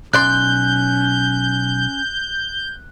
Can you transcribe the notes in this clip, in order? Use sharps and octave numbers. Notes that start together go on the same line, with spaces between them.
B1 C#4 D5 C6 F#6 G6